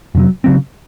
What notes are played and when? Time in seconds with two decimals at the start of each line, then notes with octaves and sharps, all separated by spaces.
0.15 F2 C3 F#3
0.44 C#3 F#3 C4